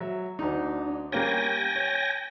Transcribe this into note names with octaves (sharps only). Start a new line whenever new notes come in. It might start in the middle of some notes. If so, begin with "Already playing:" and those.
F#3 E5
D2 D4 D#4
G3 A#3 C#4 G5 G#5 A#6
C#5